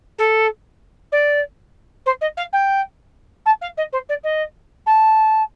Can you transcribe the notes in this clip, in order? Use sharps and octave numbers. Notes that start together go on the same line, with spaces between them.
A4
D5
C5
D#5
F5
G5
A5
F5
D#5
C5
D5
D#5
A5